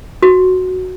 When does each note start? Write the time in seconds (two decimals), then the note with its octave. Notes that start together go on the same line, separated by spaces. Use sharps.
0.23 F#4